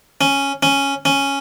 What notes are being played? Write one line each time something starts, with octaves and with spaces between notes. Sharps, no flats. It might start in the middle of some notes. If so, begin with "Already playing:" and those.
C#4
C#4
C#4